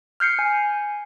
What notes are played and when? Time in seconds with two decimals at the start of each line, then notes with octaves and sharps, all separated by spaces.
0.20 F6 G6 C7 C#7
0.39 G#5